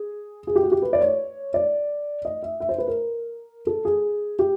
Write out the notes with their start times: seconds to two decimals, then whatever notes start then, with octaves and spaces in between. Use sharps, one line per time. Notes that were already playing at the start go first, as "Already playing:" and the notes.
Already playing: G#4
0.47 G#4
0.55 G4
0.63 F#4
0.72 G4
0.82 B4
0.93 D5
1.01 C#5
1.54 D5
2.25 D#5
2.43 E5
2.60 E5
2.69 C5
2.78 B4
2.88 A#4
3.67 A4
3.85 G#4
4.39 G4